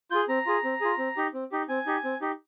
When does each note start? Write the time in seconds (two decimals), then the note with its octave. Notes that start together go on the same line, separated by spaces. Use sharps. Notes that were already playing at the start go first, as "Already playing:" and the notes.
0.11 F4 G#4 G6
0.29 C4 A#5
0.46 F4 G#4
0.64 C4
0.81 F4 G#4
0.98 C4
1.17 D#4 G4
1.34 C4
1.52 D#4 G4
1.69 C4 G#5
1.86 D#4 G4
2.04 C4
2.21 D#4 G4